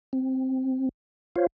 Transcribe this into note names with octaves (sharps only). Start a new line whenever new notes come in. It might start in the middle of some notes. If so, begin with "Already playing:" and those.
C4
F4 C5 C#5 F5